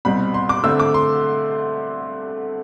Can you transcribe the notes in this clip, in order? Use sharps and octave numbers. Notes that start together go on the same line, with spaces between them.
C2 B2 G3 C4 B5
C6
D6
D3 A3 C4 E6
D6
C6